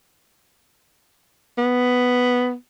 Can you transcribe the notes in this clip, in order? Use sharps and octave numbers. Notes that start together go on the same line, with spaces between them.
B3